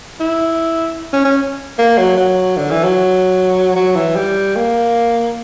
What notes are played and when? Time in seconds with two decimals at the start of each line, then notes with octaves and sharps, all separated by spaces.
0.20 E4
1.13 C#4
1.25 C#4
1.78 A#3
1.98 F#3
2.17 F#3
2.57 D3
2.71 E3
2.84 F#3
3.76 F#3
3.96 E3
4.16 G3
4.56 A#3